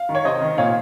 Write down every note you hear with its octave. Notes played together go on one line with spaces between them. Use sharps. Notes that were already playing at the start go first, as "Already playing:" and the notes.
Already playing: F5
D#3
C#5
C3 C5 D#5
D#3
A#2 C#5 F5